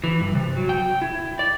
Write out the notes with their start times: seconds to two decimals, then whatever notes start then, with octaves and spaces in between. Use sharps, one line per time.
0.04 E3
0.21 G2
0.35 C3
0.56 F#3
0.69 G5
1.02 E4
1.39 D5